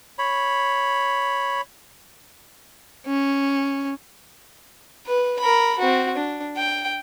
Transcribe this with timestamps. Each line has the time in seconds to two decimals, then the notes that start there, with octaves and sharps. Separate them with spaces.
0.19 C#5 B5
3.06 C#4
5.06 B4
5.39 A#4 B5
5.79 C4 F#4
6.15 D4
6.56 G5